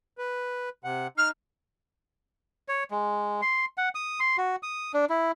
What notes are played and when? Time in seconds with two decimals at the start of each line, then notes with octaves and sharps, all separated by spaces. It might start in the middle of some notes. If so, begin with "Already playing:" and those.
0.18 B4
0.84 C3 F#5
1.17 D#4 F6
2.68 C#5
2.91 G#3
3.42 C6
3.78 F#5
3.95 D#6
4.20 C6
4.38 F#4
4.63 D#6
4.94 D4
5.10 E4